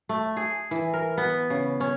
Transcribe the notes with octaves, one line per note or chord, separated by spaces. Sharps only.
A3
G#4
E3
A#4
B3
C#3
C#4